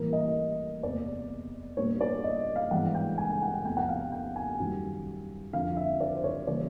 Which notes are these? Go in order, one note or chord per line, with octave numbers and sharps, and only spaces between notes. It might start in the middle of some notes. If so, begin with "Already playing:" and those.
Already playing: A1 A2 E3 G3 A#3 A#4
D#5
F#1 E2 C3 D5
A#1 A#2 G3 B3 C#5
D5
D#5
F5
G#1 G2 E3 G#3 B3 F#5
G5
G#5
G5
F#5
G5
E2 C3 F3 A3 G5
F#5
F5
G5
G#5
F#2 D#3 G3
F2 D3 F3 F5
E5
D5
C5
C#5
C#3 E3 G3 A#3 D5